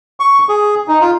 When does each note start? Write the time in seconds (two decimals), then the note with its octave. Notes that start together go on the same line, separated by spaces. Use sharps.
0.20 C#6
0.49 G#4
0.88 D#4
1.01 F4